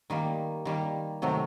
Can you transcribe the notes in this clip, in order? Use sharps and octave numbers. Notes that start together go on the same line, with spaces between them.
D#3 G3 A#3
D#3 G3 A#3
C3 D#3 F#3 A3